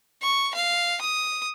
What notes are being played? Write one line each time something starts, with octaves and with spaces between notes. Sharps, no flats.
C#6
F5
D#6